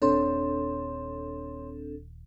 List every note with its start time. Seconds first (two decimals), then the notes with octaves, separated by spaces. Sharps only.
0.02 D#1 C4 D4 A4 C#5 C6